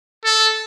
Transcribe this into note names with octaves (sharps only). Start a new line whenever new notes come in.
A4